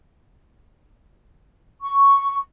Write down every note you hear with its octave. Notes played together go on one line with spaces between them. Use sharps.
C#6